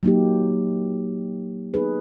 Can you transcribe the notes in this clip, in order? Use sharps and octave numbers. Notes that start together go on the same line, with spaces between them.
F#3 A#3 D#4 G4
B3 D#4 G#4 B4